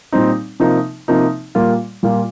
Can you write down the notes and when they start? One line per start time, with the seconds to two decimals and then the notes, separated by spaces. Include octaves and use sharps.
0.12 A#2 G3 C4 D#4
0.60 C3 F3 A#3 D#4
1.08 C3 F3 A#3 D#4
1.55 A#2 G3 A#3 F4
2.03 A#2 G3 A#3 F4